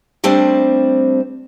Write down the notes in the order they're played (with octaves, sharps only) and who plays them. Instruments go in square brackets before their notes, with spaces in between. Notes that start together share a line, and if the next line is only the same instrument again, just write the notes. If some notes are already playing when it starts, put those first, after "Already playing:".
[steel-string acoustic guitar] G3 A3 C4 D4 C5